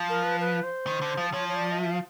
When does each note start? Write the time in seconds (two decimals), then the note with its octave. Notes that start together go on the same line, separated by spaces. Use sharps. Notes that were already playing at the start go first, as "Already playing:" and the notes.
Already playing: F3
0.09 A#4
0.24 B4
0.40 B4
0.63 C5
0.87 D#3
1.01 D3
1.17 F3
1.32 F3 C#5
1.49 C#5
1.56 D5
1.72 D#5
1.79 E5
1.91 F5